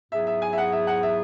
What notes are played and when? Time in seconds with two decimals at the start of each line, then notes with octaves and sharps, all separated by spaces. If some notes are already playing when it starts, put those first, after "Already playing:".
0.12 G#2 F#3 B3 E4 G#4 E5
0.27 E5
0.42 G#5
0.53 E5
0.58 F#5
0.72 E5
0.87 F#5
1.03 E5